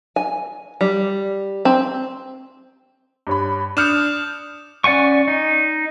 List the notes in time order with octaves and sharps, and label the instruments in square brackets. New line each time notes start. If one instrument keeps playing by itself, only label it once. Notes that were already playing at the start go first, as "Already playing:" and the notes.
[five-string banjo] G#5
G3
C4
[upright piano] G2 C#5 B5
[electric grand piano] D4 F6 [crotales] D#6 G6 E7 [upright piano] C#7 D#7
[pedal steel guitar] C#4 D5 F#5 G#5 C#6
D#4